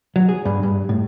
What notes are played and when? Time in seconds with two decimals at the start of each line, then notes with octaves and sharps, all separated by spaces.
0.16 F#3
0.29 G#4
0.45 G2
0.63 G2
0.89 A2